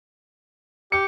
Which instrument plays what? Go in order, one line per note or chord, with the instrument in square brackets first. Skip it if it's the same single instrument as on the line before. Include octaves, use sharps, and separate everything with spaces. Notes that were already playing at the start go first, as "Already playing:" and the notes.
[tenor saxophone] G4 [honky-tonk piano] C#7